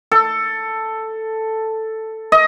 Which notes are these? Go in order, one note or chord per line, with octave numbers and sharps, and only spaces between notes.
A4
D#5